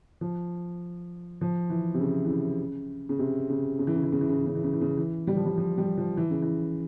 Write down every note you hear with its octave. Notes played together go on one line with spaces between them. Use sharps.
F3
F3
E3
C3
C#3
E3
C#3
C#3
C3
C#3
C#3
E3
C#3
E3
C#3
E3
C#3
E3
C#3
E3
C#3
E3
C#3
E3
G3
F3
G3
F3
G3
F3
E3
C#3
E3